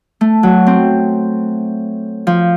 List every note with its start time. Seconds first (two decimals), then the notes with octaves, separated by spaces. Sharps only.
0.21 A3
0.43 F#3
0.66 C4
2.27 F3